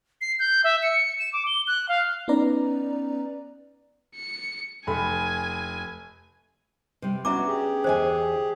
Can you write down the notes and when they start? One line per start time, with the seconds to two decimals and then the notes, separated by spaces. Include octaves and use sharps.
0.21 C7
0.39 G6
0.64 E5
0.83 C#7
1.19 E7
1.33 D6
1.47 G7
1.67 F#6
1.89 F5
2.28 B3 C#4 D#4 B4 D5 A#5
4.16 C#7
4.87 F1 G#5 B5
7.02 C3 G3
7.25 B3 C#4 D4 F#4 E5 A#5 D6
7.47 G4 G#4
7.84 E2 D3 C5 D#5 G#5